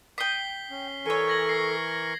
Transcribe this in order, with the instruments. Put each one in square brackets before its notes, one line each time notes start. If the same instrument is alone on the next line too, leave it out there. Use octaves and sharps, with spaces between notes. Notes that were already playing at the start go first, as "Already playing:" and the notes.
[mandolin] G5 D#6 [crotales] B6 C7 G7
[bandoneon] C#4
[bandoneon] E3 A#4 C#6 [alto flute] A4 [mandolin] C#5 G#5
[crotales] G#6 A#6 F#7
A#6 C7